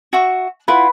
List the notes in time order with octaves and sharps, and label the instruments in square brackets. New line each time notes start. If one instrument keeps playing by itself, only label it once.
[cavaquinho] F#4 E5 C#6
[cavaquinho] E4 F4 F#5 [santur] B4